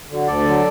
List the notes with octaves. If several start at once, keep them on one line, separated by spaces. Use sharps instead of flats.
D3 F#3
D2 A4 D5
D3 F#3